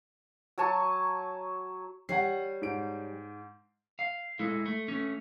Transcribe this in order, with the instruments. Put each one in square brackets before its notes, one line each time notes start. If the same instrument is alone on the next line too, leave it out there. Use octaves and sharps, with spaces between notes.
[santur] F#3 G#5 A5 C#6
[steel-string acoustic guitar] G3 C#5 [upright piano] F#5 C7
[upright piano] G#2 D7
[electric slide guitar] F5
G#3 E4 A4
A3
A3 C#4